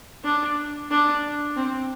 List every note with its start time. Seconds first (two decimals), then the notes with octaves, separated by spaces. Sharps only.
0.24 D4
0.90 D4
1.56 C4